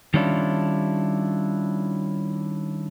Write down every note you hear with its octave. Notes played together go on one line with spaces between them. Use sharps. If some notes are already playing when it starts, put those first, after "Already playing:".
D#3 G3 C#4 D4 E4 F4